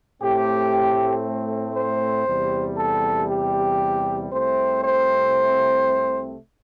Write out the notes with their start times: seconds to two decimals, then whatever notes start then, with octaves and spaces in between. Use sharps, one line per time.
0.21 A2 A3 C4 G4
1.75 C5
2.27 E2 C3 G3
2.77 A4
3.30 G4
4.32 C2 C3 A3 C4 C5
4.83 C5